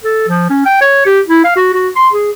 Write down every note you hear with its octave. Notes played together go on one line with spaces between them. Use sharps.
A4
F3
C#4
G5
C#5
G4
E4
F5
F#4
F#4
C6
G#4